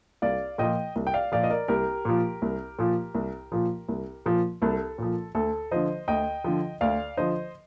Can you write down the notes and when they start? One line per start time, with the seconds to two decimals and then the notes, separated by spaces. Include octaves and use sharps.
0.22 C2 D5 F5
0.58 A#2 F3 D#5 G5
0.96 C2
1.07 G5
1.13 D5 F5
1.32 A#2 F3 D5 F5
1.44 D#5
1.50 A#4 D5
1.68 C2 G4 A#4
2.05 A#2 F3
2.42 C2
2.79 A#2 F3
3.15 C2
3.52 A#2 F3
3.89 C2
4.26 A#2 F3
4.62 C2 A4
4.98 A#2 F3
5.35 D2 A4
5.72 D3 F3 C5 D#5
6.08 D2 D#5 G5
6.44 D3 F3
6.81 D2 D5 F5
7.17 D3 F3 C5 D#5